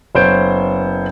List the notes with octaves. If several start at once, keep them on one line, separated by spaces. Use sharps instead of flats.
F#1 B3 C5 C#5 G6 D7